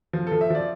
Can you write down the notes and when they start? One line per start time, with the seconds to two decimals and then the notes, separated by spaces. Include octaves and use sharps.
0.13 F3
0.27 A4
0.32 F3
0.41 E5
0.50 F3 D5